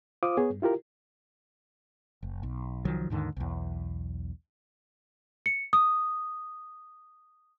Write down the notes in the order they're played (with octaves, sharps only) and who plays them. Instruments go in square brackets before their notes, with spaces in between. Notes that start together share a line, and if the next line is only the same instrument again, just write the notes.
[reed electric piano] F4 C5 F5 D6 D#6
B3 G#4 C#5
G2
E4 F4 G4 A#4
[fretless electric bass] F#1
B1
C2 D#3 F3 F#3
D#2 G#2 D3 D#3
B1 E2
[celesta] C#7
D#6